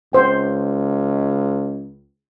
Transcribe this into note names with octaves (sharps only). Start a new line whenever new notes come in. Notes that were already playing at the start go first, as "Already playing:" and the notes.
C#2 C5 G5